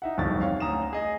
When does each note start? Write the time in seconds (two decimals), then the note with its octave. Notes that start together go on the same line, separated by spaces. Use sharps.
0.02 D#4 E5 F#5
0.18 D1 G1 C2 F2 D#3 A6
0.41 C#5 F5
0.60 D2 C#4 A#5 D#6 E7
0.93 G#4 D#5